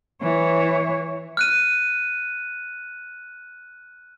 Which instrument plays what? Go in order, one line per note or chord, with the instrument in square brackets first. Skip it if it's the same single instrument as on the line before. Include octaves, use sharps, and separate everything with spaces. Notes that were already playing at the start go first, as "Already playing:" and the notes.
[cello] E3 C#5
[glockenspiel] F6 F#6 D#7